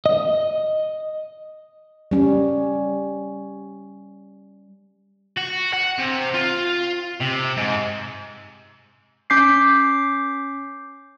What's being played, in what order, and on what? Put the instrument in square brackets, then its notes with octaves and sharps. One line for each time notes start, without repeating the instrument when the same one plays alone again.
[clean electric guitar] D#5
[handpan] G3 C#4
[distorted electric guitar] F#4
F#5
C3
F4
C3
G#2
[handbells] C#4 D6 G6 B6 C7